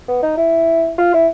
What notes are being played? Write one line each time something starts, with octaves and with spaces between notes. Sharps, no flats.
B3
D#4
E4
F4
E4